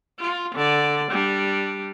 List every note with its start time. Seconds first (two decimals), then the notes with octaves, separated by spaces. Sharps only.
0.20 F4
0.55 D3 D5
1.11 G3 D4